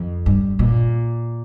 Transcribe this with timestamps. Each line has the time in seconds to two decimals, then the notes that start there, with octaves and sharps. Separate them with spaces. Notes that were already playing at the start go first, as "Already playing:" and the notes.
Already playing: F2
0.26 G2
0.59 A#2